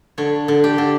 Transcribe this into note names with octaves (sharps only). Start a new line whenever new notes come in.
D3 C#5
D3
G4
D3